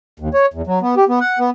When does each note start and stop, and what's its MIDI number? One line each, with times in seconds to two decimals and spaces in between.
0.20 0.29 39
0.34 0.46 73
0.54 0.62 40
0.67 0.79 54
0.82 0.95 59
0.97 1.04 67
1.09 1.19 59
1.21 1.39 78
1.39 1.50 59